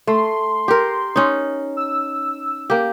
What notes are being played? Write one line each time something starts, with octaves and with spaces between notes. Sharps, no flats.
A3 C6
G4 A#4
C#4 D#4
E6
A#3 G4